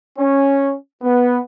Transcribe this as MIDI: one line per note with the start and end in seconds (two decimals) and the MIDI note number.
0.19 0.74 61
1.03 1.38 59